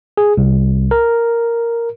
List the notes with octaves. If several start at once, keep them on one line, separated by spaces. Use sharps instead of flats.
G#4
C2
A#4